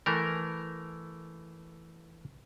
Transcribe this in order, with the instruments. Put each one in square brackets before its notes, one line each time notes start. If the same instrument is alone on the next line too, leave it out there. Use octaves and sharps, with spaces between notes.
[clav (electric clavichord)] E3 A3 A#4